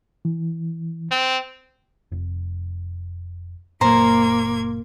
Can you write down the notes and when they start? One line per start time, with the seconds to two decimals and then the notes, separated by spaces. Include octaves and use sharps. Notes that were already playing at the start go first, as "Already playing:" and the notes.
0.25 E3
1.11 C4
2.12 F1
3.81 F#1 A#2 A#3 C5 A#5 G#6